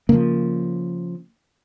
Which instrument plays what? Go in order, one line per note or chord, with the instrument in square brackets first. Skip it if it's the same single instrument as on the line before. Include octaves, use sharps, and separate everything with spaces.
[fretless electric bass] C#3 F3 [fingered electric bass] A#3